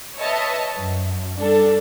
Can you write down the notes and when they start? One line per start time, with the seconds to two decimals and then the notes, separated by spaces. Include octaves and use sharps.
0.17 B4 C#5 D#5 E5 A5
0.76 F#2
1.38 G3 D4 A4